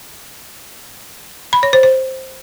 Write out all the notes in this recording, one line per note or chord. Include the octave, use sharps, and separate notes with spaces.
B5
C#5
C5
C5